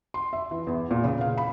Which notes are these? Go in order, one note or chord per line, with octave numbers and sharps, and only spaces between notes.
C6
E5
E3
E2
A#2
C#3
F5
B5